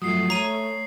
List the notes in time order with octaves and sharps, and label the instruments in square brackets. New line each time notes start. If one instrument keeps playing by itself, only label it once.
[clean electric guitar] G2 F3 F#3 [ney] A3 [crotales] D#6 C7
[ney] A3 [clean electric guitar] C#5 [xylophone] A#5 D#7